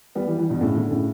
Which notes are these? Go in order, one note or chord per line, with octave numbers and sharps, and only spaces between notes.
G3 B3
E3 G3
E3 G3
G2 B2
A2 C#3
B2 D3
A2 C#3